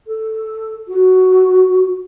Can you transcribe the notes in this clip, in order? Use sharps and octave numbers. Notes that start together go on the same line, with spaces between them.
A4
F#4